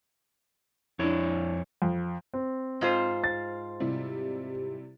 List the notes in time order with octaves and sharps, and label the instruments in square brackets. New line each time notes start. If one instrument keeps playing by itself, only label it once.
[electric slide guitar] F2 C#5 [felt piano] D4 E4
[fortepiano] F2
[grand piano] C4
[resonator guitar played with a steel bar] G#2 F4 C5
[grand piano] A6
[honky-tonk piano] C3 G3 E4